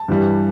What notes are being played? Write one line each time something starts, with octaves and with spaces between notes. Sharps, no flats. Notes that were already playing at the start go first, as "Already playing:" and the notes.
Already playing: A5
G2 E3 G3